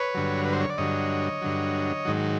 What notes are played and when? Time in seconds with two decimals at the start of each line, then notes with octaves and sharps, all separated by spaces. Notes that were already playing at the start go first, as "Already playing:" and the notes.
Already playing: B4 C#5
0.15 G2 D3 F#3
0.45 B4
0.53 C5
0.61 C#5
0.70 D5
0.78 G2 D3 F#3 C#5 D#5
1.42 G2 D3 F#3
2.05 G#2 D#3 F#3